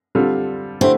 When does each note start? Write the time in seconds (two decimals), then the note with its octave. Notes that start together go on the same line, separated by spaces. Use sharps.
0.15 D3 G3 C4 F4 A4
0.81 D3 A3 C4 E4 G4